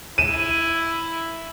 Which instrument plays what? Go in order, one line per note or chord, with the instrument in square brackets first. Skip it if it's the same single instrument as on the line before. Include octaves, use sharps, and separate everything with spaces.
[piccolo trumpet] E4 [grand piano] D#7 E7